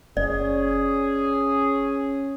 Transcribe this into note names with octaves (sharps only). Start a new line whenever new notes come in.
F#1 C#4 G#4 D5